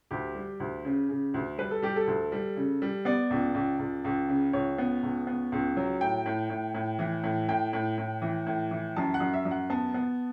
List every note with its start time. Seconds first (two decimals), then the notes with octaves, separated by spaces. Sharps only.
0.11 D2 G4
0.35 G3
0.60 D2
0.85 C#3
1.09 C#3
1.34 D2
1.58 G3 B4
1.71 A4
1.82 G3 G4
1.96 A4
2.07 D2
2.32 G3
2.57 C#3
2.82 G3
3.05 B3 D5
3.31 C#2
3.54 C#2
3.79 C#2
4.05 C#2
4.29 C#3
4.53 C#2 C#5
4.78 B3
5.03 C#2
5.27 B3
5.52 C#2
5.77 F#3
6.01 A2 G5
6.26 A2
6.50 A2
6.74 A2
6.99 E3
7.23 A2
7.49 A2 G5
7.73 A2
7.98 A2
8.22 E3
8.46 A2
8.71 E3
8.96 F#2 A5
9.14 F#5
9.20 F#2
9.34 E5
9.45 F#2
9.51 F#5
9.70 B3 A5
9.94 B3